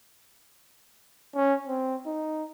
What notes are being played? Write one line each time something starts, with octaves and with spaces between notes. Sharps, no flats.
C#4
C4
D#4